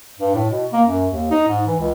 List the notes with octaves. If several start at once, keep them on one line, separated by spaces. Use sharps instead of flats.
G2
A2
B2
A#3
F#2
D#2
D#4
G#2
E3
C#2